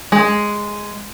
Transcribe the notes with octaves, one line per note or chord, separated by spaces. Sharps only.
G#3